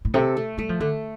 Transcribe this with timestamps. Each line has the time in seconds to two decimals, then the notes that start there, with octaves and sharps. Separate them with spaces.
0.05 A2
0.14 C3 A4
0.37 A3
0.58 G3 A3
0.69 F3
0.80 D3 A3